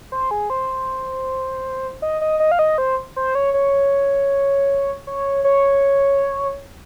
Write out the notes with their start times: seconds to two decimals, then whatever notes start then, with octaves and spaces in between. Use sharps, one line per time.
0.12 C5
0.31 G#4
0.50 C5
2.02 D#5
2.21 D#5
2.40 D#5
2.51 F5
2.59 D#5
2.78 C5
3.16 C5
3.35 C#5
3.54 C#5
5.07 C#5
5.44 C#5